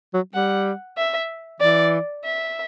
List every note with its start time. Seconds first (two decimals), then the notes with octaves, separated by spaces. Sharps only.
0.14 F#3
0.34 G3 F#5
0.97 E5
1.60 E3 D5
2.25 E5